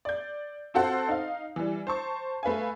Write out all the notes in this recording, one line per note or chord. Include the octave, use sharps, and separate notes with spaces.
D5 G6
C4 F4 F#4 A4 C5 F#5
D#4 F5
E3 G3
C5 A5 C#6
A3 B4 F5 G#5